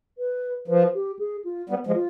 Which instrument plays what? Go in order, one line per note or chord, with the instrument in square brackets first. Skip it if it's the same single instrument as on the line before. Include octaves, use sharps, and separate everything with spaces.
[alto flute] B4
[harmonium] F3 [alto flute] B4
[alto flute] G4
G#4
F4
[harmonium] G3 B3
F3 G#3
[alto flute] F4